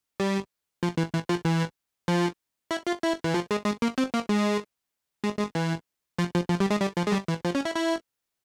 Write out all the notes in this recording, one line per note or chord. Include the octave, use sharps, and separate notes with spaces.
G3
F3
E3
E3
F3
E3
F3
E4
F4
E4
E3
F3
G#3
G#3
A#3
C4
A#3
G#3
G#3
G#3
E3
F3
F3
F3
G3
G#3
G3
F3
G#3
G3
E3
F3
C#4
E4
E4